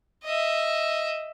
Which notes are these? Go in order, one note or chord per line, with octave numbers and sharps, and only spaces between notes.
D#5 E5